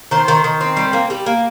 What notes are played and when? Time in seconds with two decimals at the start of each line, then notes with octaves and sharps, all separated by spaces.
0.11 D#3 C5
0.28 D#3
0.44 D#3
0.61 C4
0.77 G3
0.93 A#3
1.10 G3
1.26 A#3